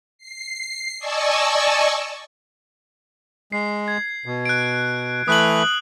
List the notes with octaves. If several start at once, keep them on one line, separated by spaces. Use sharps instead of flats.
C7
D5 D#5 G#5 A5 C#6 E6
G#3 C7
G#6
B2
F#6 D7
E3 A3 B4 D#6 F#6 F#7